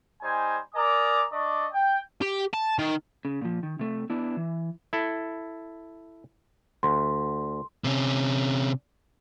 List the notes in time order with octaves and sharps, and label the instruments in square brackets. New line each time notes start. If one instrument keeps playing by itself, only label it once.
[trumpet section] G3 D#4 C5 G#5
A#4 D5 G#5 A#5 D6 D#6
D4 D5 D#5 C#6
G5
[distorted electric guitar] G4
A5
D#3
[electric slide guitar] C#3
A#2 F3
D#3
C3 A3
B3 D4 E4
E3
[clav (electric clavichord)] E4 A4
[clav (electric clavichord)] D2 [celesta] C6
[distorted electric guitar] C3 C#4